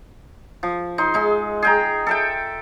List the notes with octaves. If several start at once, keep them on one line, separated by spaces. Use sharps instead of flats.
F3
D#4 C6
G#3 D#4
G#4 G5 A#5
A4 E5 G5